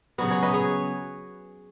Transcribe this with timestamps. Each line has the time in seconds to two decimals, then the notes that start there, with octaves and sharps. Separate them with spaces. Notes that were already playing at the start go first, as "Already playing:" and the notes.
0.18 C#3 F#3 B3 F#4
0.30 G#4 C#5
0.42 B4 D#5
0.54 G#4 C#5